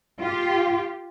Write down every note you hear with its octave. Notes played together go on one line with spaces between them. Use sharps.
F4 G4